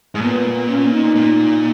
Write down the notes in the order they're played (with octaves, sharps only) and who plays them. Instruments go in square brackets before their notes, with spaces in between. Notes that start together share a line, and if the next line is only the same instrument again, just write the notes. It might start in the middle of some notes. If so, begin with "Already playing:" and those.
[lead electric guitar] G#2
[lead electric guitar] A#2 [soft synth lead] B3
[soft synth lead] C#4
D#4
[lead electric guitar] A#2